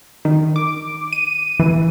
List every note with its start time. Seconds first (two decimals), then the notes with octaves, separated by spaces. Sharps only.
0.25 D#3
0.56 D6
1.12 D#7
1.60 E3